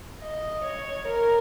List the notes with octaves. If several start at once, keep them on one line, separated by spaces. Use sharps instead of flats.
D#5
C#5
A#4